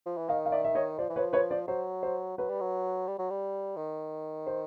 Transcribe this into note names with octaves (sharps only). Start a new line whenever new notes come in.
F3
E3
D#3 D#5 F5
F5
D5 E5
E5
C#5 D#5
F3 C5 D5
E3
B4 C#5
F3
B4 C#5
C5 D5
F#3 C5
C5
F#3 B4
G3
F#3
G3
F#3
G3
D#3
C5